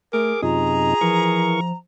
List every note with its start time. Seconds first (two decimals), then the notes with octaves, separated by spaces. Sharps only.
0.13 A3 G#4 A#4 D6
0.42 F#2 C3 D#4 F4 G#4 A#5
1.01 E3 F3 A#4 C#6